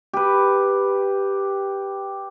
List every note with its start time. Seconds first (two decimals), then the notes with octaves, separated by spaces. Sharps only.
0.13 G4 B4